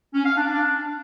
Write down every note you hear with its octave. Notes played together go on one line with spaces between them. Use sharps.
C#4
F5
D4
D4